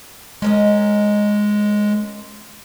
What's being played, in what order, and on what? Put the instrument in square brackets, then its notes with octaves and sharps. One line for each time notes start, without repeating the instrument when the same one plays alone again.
[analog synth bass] G#3 [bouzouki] C#4 A#4 D#5